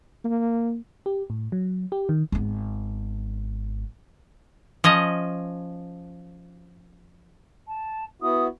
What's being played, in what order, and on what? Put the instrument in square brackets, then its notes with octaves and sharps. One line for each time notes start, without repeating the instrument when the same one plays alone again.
[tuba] A#3
[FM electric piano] G4
A2
F#3
G4
D#3
[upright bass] G#1 B3
[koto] F3 C#4 D#5
[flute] A5
[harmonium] B3 E4 F#4 [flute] D#6